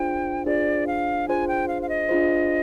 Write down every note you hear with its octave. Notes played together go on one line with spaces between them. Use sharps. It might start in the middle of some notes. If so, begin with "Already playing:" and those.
Already playing: D4 F4 G#4 C5 G5
D4 F4 G#4 C5 D5
F5
D4 F4 G#4 C5 G#5
G5
F5
F5
D#5
D4 F4 G#4 C5